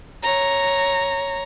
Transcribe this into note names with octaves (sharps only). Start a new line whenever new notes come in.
C#5 A#5